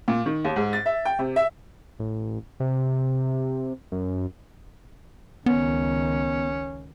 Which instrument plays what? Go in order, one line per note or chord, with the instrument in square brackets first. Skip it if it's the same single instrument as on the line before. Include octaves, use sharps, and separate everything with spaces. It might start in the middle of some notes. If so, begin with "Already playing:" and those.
[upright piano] A#2
D#3
D#2
G#2
A6
E5
G5
C3
E5
[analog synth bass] A1
C3
F#2
[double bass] C#2 D#3 [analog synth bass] B3 [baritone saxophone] C#4